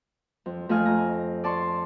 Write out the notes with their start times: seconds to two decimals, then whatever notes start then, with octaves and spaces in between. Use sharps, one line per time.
0.46 F2
0.69 F2 A3 F4 D#5 G#5 F6
0.86 A#5
1.44 D5 A5 C6 C#6